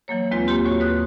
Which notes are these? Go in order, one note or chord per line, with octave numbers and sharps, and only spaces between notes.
E3 F#3 A#3 C#5
D#2 G#3 C4 F4 B4
A#3 F4 G4 C6
D#2 A2 F#4 C#5
B4 D#6 F#6